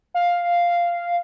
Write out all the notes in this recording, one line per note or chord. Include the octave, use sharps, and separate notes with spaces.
F5